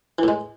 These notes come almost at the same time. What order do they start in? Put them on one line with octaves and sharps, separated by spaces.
E3 A2 G#3